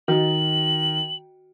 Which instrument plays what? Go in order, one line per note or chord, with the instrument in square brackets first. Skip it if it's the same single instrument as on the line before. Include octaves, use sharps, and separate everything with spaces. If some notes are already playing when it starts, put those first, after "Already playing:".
[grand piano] D#3 [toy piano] F#4 D#5 [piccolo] F#7